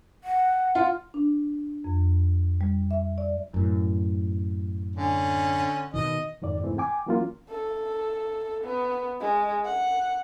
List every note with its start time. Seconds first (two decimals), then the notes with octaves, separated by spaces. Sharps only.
0.24 F#5
0.75 F4
1.14 D4
1.84 F2
2.61 G3
2.91 E5
3.18 D5
3.54 F#2 A2
4.96 D3 C#4
5.94 B2 D#3 D#5
6.42 F2 G#2 D#3 D5
6.64 E2 G#2 C3 E3 A3 C4
6.78 G5 G#5 D6
7.07 E3 F#3 A#3 C#4 F4
7.50 A4
8.64 B3
9.21 G#3
9.65 F#5